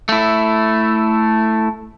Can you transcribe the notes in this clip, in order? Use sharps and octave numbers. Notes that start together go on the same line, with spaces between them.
A3 E4